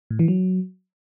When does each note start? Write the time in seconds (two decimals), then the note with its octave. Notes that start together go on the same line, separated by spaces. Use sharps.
0.11 A2
0.19 E3
0.28 F#3